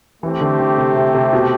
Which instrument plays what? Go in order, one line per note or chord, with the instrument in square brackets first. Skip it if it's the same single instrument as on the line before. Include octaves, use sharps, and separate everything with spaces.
[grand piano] E3 [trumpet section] A3 C4 G4
[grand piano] D3
D3
C3
C3
C3
B2